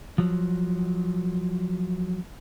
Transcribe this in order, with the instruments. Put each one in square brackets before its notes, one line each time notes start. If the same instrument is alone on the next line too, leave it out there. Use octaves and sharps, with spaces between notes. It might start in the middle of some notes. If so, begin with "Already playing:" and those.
[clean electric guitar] F3 F#3